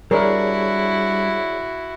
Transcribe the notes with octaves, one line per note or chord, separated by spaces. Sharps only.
G3 D4 E4 F#4 G#4 A#4 C#5 D5